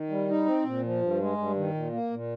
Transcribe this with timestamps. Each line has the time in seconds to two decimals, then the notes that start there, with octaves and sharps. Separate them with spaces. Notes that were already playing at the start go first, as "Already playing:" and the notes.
Already playing: D#3
0.10 G3
0.28 D#4
0.46 C4
0.65 A#2
0.83 F3
1.01 G2
1.19 G#3
1.37 G2
1.56 D#3
1.74 A#2
1.92 A#3
2.11 A#2